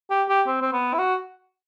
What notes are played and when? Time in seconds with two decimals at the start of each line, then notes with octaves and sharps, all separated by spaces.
0.10 G4
0.29 G4
0.47 C4
0.61 C4
0.72 B3
0.93 E4
0.98 F#4